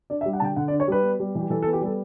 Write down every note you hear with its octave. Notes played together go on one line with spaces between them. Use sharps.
D4 D5
E5
G3
F#5
D3 G5 A5
D3 F#5
D5
D4
C#5
G3 B4
B3
G3
E3
G4
E3 A4
A4
B3
G4
G3 A4